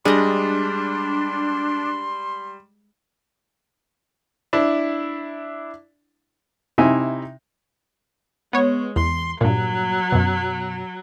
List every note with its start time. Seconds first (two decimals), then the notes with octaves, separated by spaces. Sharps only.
0.05 G3 G#3 D4 D#5 C6
4.53 D4 E4
6.78 C3 D#4 E4 E5 G#5
8.53 G#3 B3 C#5
8.96 E2 C6
9.41 G2 A#2 F#3
10.12 F#2 B2